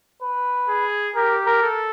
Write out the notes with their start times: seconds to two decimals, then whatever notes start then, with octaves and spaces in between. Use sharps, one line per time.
0.22 B4
0.69 G#4
1.16 G4 A#4
1.46 A#4
1.62 A4